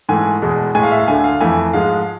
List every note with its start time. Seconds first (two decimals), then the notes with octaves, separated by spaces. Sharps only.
0.09 G#2 E3 A3 G#5
0.42 E2 B2 G#3
0.75 A2 G#3 G#5
0.83 F5
0.92 E5
0.99 F5
1.08 D2 D3 A3 G#5
1.24 F5
1.41 F2 E3 A3 G#5
1.73 G#2 F3 G#3 F5